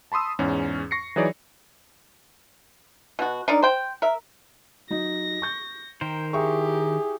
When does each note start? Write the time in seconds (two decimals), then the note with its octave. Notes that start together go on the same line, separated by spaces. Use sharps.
0.12 A5 B5 C6 D#6 E6
0.39 E2 G#2 C#4
0.91 C#6 A#6 C7 C#7
1.16 E3 F#3 D#4 G#4 C#5 D5
3.19 B2 F#4
3.48 D4 D#4 A#4 D5
3.62 C5 G5
4.02 A#4 E5
4.90 F#3 D#4 D#5 A#6
5.42 C#6 G6
6.01 D#3 A#4 C5 G5
6.33 E4 G4 G#4 E5 G5 C#6